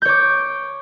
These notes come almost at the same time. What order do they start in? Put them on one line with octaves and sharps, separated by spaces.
G6 C#5 D6